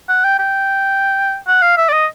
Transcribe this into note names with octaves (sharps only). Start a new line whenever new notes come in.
F#5
G5
G5
F#5
F5
E5
D5
D#5